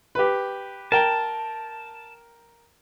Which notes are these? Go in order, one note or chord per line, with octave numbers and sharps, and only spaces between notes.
G4 B4
A#4 G5 A5